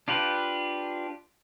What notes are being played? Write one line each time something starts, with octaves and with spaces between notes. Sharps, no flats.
D4 F4 G4 B4